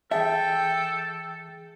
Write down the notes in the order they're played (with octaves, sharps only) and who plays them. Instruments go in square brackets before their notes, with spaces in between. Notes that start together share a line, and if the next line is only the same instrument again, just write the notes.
[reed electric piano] E3 G#4 A5 [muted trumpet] A4 [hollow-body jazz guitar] E5 [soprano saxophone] G5